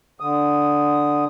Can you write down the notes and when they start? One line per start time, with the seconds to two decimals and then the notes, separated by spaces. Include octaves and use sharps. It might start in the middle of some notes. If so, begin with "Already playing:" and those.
0.20 D3 D#6